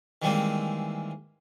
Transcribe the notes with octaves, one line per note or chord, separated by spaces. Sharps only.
D#3 E3 G3 G#3 A#3 C4